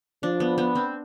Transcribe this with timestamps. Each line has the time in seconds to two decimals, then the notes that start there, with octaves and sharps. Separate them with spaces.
0.23 F3 D4
0.40 B3
0.58 B3
0.75 C4